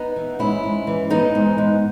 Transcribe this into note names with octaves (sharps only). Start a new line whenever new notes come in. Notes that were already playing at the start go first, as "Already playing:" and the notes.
Already playing: B3 D#4
E3
G#2 C#4 E4
G#2
E3
E3 B3 D#4
G#2
G#2